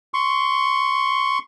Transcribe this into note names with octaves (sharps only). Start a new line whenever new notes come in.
C6 C#6